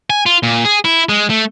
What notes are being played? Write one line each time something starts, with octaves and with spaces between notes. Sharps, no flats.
G#5
F4
A#2
G#4
E4
G#3
A3